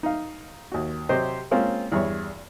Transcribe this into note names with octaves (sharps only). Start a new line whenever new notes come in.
D#4 F5
D#2 F#4
C3 F#3 G4 C5 D#5
G#3 A#3 C4 C#4 F4
E2 G2 C#5